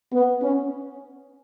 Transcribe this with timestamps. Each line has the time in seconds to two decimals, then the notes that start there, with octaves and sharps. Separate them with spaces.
0.14 B3
0.43 C#4